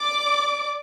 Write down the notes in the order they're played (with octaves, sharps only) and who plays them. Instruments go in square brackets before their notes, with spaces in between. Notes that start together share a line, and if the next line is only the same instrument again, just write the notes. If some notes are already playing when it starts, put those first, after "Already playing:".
Already playing: [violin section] D5 D6